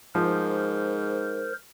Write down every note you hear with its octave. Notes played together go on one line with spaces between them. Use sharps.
G#2 F3 A#4 C5